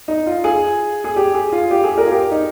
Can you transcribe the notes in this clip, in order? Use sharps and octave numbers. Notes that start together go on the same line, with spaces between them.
D#4
F4
G#4
G#4
G4
G#4
F4
G4
G#4
A#4
F4
G4
D#4